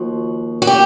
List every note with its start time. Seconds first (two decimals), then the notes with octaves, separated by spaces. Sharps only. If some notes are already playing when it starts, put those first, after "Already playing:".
Already playing: D#2 F3 F#4
0.62 F#4
0.67 G4